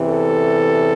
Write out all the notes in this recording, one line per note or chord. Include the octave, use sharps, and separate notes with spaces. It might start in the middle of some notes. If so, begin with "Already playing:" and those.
Already playing: E2 C3 E3
A4